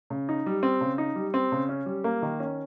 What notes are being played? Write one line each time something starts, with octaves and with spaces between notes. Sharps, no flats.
C#3
D#4
G3
C4
C#3
D#4
G3
C4
C#3
C#4
G3
A#3
D#3
C#4